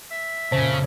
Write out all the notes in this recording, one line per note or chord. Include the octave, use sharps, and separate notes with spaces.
E5
F2 A#2 C#3 C5